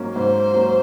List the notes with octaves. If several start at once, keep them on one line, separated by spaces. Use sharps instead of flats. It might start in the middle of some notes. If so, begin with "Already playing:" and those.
Already playing: G#2 F#3 A#3 C#4
G#2 C5
F#3 A#3 C#4